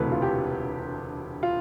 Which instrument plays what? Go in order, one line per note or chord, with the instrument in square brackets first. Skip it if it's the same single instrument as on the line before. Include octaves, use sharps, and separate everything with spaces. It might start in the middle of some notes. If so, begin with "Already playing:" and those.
Already playing: [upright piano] E1 D2 C3 E3 A3 B4
F4
G4
F4